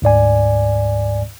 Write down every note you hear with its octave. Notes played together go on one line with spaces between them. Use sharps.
D2 G#2 D5 G#5